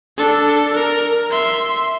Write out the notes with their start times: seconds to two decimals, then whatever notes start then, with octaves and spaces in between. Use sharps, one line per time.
0.17 D4 A4
0.74 A#4
1.30 E5 C6